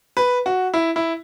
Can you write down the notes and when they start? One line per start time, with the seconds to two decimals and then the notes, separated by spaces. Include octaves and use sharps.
0.17 B4
0.46 F#4
0.74 E4
0.96 E4